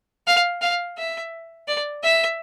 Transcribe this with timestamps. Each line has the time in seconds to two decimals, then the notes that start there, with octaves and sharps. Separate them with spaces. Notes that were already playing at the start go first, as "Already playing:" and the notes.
0.27 F5
0.61 F5
0.98 E5
1.68 D5
2.03 E5